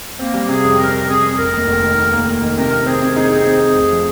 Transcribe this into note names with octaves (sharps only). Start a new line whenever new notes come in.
A#3 C4
G3
C3 G#4
F2
C4 A#4
C4
C3 G#4
C3
F1 A#4
D#2
F1
D#3
A#3
A#3
A#3
D#3
C3 A#4
C3
C4 G#4
C3
D#4 G#4
C4
C4
C4
F1
F3